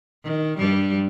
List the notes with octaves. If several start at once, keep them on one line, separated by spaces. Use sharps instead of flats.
D#3
G2 G3